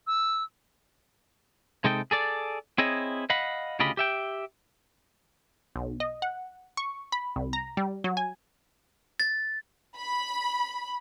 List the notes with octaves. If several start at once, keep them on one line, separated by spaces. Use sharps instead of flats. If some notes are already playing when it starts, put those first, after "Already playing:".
E6
C3 G#3 D#4 A4 G5
G#4 A4 D5
C4 E4 G#4 C#5 D#5
D#5 F5 F#5 B5
D2 C#3 F4 G4 D#5 B5
G4 E5 G5
B1
D#5
F#5
C#6
B5
C2
A#5
G3
F#3
G#5
A6
B5